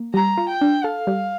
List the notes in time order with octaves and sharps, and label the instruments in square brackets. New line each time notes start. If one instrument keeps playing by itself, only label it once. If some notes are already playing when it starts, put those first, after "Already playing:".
Already playing: [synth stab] A#3
[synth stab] G3 [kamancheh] A#5
[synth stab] F4
[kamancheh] G5
[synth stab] D4
[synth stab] A4 [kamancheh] F5
[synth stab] G3